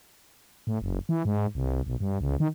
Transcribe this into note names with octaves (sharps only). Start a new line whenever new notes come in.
A2
F#1
E3
G#2
C2
B1
G2
C#2
D#3